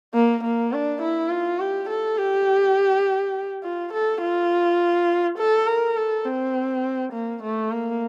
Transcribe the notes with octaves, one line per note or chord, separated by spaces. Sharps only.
A#3
A#3
D4
E4
F4
G4
A4
G4
F4
A4
F4
A4
A#4
A4
C4
A#3
A3
A#3